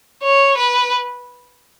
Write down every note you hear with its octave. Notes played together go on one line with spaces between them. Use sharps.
C#5
B4